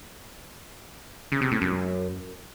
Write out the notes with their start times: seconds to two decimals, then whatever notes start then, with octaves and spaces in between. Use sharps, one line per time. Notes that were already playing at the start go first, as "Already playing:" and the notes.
1.32 C#3
1.42 C3
1.52 A2
1.62 F#2